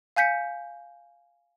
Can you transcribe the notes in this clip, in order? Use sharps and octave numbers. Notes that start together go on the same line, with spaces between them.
F5 G#5 G6 B6 C#7